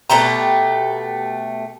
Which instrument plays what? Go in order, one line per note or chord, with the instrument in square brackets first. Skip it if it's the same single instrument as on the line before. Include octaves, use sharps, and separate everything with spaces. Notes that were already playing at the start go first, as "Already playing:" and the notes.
[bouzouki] B2 A3 G4 A#5